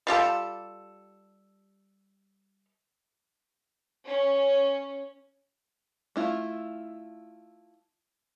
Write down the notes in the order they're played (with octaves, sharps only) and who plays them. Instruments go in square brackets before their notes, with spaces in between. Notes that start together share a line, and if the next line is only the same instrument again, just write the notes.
[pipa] G3 F4 G4 A4
[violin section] C#4
[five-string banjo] A3 E4 F4